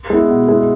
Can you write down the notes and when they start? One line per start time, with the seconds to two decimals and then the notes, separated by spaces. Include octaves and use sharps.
0.10 G#3 B3 E4
0.30 B2
0.48 G#3 B3 E4